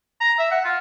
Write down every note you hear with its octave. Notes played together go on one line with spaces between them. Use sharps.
A#5
E5
F#5
F4